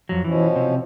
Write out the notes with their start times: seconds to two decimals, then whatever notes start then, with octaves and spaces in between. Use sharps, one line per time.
0.09 F2 F#3
0.24 B2 E3 F3 C#4
0.56 C3